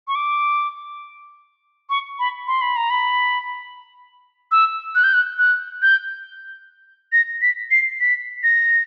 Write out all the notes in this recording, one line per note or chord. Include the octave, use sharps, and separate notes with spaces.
C#6
D6
C#6
B5
C6
B5
A#5
B5
E6
F#6
G6
F#6
F#6
G6
A#6
B6
C7
B6
A#6